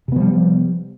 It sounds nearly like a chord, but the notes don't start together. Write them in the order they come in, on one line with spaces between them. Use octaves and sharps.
C3 B3 F3 G3